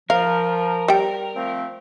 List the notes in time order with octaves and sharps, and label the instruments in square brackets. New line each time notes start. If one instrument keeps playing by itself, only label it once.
[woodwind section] F3 [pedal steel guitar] A#4 [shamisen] F5
[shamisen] G3 G5
[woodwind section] F3 A3 C4